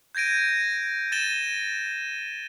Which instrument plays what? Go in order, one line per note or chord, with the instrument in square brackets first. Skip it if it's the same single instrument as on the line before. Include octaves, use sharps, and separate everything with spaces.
[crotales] G6 G#6 A#6 D7 D#7
A6 D#7 E7 G7